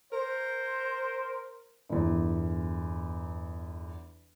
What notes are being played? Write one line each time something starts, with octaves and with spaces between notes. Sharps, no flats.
A#4 C5
G1 E2